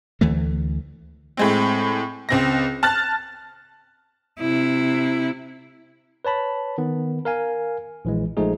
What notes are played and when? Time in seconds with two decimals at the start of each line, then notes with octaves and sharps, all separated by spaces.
0.21 D2 E3 A3
1.37 A2 G#3 C4
2.29 C#2 C4 A#6
2.83 A5 F6 F#6 A6
4.40 C3 E4
6.25 B4 C#5 A5 B5
6.78 D#3 B3
7.25 A#4 F5 G#5
8.05 A#1 E3 G#3
8.37 A#1 F3 G#3 A3 D#4 G#4